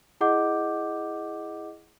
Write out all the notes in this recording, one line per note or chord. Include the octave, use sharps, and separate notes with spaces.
E4 G#4 D#5 F#5 D6 G6